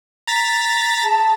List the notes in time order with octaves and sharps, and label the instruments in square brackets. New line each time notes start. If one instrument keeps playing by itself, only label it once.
[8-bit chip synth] A#5 A6 B6
[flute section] G#4 A5